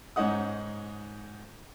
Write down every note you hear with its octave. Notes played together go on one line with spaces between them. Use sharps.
G#2 C#4 D#4 F#5 D#6